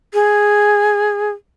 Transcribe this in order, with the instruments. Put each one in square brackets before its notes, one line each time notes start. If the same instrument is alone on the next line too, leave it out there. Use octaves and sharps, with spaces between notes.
[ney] G#4